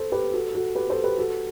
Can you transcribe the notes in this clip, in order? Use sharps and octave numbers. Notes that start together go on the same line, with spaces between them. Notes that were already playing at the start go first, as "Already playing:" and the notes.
Already playing: A4 C5
G4 B4
F#4 A4
F#4 A4
G4 B4
A4 C5
G4 B4
F#4 A4